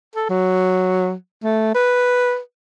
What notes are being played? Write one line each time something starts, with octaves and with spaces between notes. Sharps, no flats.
A4
F#3
A3
B4